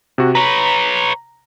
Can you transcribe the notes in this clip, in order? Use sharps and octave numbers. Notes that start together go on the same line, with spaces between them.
C3 F#4
B4 C#5 A#5